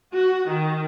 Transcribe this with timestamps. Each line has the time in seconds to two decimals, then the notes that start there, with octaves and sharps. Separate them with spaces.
0.13 F#4
0.50 D#3